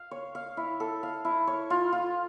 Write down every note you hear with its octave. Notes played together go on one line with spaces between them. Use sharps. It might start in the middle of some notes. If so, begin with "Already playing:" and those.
Already playing: F5
C#5
F5
E4
A4
F5
E4
C#5
F4
F4